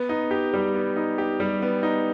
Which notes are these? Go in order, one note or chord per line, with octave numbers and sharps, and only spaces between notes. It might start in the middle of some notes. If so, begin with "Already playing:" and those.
Already playing: B3
D#4
G4
G3
B3
D#4
G4
G3
B3
D#4